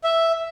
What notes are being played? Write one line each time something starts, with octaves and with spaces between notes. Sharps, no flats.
E5